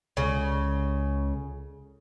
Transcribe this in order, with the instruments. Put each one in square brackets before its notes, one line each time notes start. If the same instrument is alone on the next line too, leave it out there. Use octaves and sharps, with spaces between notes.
[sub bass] C#2 [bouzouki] C#3